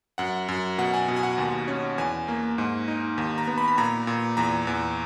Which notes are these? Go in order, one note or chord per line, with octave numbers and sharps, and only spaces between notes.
F#2 F#5
F#2
B2 F#5
G#5
B2
G#5
F#5
D#2
C#4
E2 G#5
A#3
G#2
D#4
D#2
A#5
B3
B5
B5
A#2 A#5
A#2
E2 A#5
E2